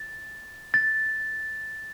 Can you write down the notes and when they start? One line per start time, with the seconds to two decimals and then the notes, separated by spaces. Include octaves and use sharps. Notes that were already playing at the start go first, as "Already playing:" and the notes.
Already playing: A6
0.74 A6